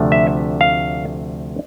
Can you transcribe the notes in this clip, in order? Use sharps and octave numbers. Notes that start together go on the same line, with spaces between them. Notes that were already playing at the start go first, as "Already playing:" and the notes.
Already playing: D2 C3 F3 A3 D4
E5
F5